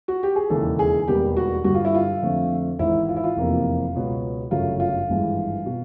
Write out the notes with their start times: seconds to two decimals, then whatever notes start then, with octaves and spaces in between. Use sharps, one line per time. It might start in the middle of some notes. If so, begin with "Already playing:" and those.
0.08 F#4
0.23 G4
0.36 G#4
0.50 E1 D#2 C#3 E3 A4
0.79 G#4
1.07 E1 D#2 D#3 G3 B3 G4
1.37 F#4
1.64 G2 D3 G3 F#4
1.74 F4
1.85 E4
1.94 F4
2.22 F2 D3 F3 A3 C4
2.79 G#1 G#2 E3 E4
3.09 F4
3.17 E4
3.24 F4
3.36 F1 E2 C3 F3 A#3
3.95 C#2 B2 F#3 B3
4.51 G1 F#2 C#3 F#3 A3 F4
4.80 F4
5.09 G#1 G2 E3 G#3
5.66 B2